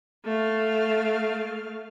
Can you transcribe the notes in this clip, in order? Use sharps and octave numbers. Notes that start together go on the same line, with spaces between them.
A3 F5